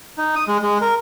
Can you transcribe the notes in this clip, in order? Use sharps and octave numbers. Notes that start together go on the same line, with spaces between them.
D#4
D#6
G#3
G#3
A#4